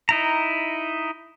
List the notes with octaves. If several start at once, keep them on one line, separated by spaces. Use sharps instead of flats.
D#4 E4 A#5